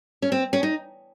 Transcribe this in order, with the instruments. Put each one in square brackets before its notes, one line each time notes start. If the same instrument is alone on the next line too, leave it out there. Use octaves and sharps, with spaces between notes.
[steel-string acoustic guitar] C#4
C4
C#4
D#4